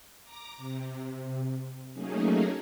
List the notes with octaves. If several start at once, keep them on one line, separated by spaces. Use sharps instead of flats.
A#5 D6 A#6
C3
F#3 A3 A#3 C#4 D#4 G#4